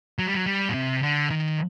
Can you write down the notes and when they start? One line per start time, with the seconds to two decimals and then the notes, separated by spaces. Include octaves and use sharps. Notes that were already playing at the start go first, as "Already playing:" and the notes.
0.19 F#3
0.27 G3
0.35 F#3
0.46 G3
0.69 A#2
0.74 C3
1.02 D3
1.30 D#3